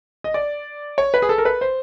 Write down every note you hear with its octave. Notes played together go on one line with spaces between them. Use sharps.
D#5
D5
C#5
B4
G#4
A4
A#4
B4
C5